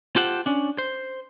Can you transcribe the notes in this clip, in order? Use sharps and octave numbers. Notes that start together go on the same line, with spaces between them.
F4 G4 A4 C5 F#5
C#4 D4
C5